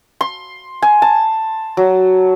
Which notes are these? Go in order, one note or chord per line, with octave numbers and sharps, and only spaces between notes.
C6
G#5
A5
F#3